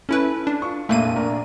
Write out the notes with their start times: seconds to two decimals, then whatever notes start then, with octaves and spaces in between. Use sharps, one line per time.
0.09 C#4 E4 A4 B4
0.47 D4
0.62 F4 C#6
0.89 F1 A#1 A3 A#3 D#7
1.16 A#1 D4 A#4